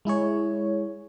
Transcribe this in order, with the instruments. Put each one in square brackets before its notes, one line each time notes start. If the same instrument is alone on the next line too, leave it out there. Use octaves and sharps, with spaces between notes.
[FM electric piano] G#3 E4 G#4 C#5